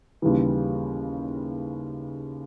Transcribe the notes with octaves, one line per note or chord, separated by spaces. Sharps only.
D#2 C#3 E3 G3